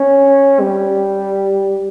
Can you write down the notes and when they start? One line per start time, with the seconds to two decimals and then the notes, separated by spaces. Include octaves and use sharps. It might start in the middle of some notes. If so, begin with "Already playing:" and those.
Already playing: C#4
0.60 G3